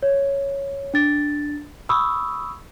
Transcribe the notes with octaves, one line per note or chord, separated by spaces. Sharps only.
C#5
D4 A6
B5 C#6 D#6 E6